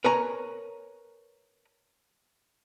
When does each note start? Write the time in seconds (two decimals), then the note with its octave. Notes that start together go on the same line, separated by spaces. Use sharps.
0.04 A#4 B4 C#5 G#5 A#5